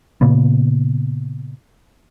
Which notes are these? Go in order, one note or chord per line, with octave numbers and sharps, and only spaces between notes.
A#2 C#3 A#3 B3